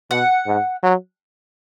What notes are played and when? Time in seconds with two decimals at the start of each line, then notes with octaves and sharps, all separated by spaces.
0.11 B2 F#5
0.46 G#2
0.83 F#3